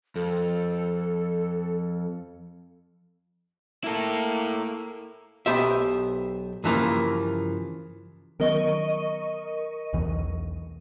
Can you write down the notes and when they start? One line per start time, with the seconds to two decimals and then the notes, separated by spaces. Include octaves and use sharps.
0.16 F2 A4
3.84 A#3 E4 A4
5.46 B1 B3 G4 C5 E5
6.64 G2 C#3 E3 F3 A#3
8.40 D#3 F#3 B3 A#4 D#5 C#6
9.93 B1 E2 E3